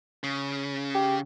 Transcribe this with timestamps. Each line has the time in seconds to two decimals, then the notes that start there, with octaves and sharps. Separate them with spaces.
0.23 C#3
0.95 G4